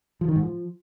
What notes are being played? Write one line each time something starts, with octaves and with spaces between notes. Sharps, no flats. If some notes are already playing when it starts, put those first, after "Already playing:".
F3
D#3
G#2
F3